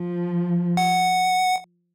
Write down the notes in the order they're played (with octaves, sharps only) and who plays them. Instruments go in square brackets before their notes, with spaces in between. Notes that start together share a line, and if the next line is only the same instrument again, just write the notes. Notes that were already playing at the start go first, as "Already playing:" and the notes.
Already playing: [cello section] F3
[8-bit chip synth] F#5